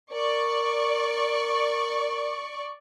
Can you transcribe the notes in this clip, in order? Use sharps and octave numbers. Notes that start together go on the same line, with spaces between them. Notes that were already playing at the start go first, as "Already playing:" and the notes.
A#4 D5 C#6